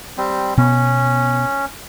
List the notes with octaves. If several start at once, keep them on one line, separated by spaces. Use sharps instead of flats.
G3 C4
B2 B3 C#4